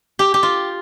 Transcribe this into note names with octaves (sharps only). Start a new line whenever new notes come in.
G4
G4
F4